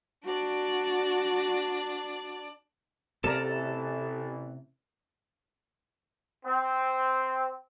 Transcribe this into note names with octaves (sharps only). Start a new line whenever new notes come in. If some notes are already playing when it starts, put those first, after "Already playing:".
D4 F#4 D5
A1 C3 E3 A4 A#4 D5 A5 A#5
C4